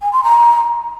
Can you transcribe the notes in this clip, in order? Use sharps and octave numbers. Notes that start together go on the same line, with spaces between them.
G#5
C6
A#5